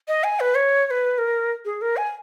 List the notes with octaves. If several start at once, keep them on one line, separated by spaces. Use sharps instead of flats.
D#5
G#5
B4
C#5
C#5
B4
A#4
G#4
A#4
G#5